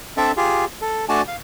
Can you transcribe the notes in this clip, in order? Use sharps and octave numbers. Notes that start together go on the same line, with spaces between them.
C4 D4 A4 D5 E5
F4 G4 G#4
A4
A3 D4 F#4 D5 G#5 A5
F5